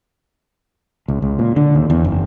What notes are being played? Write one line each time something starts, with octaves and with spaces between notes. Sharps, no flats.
C#2
C#2
A#2
D3
D#2
E2
F#1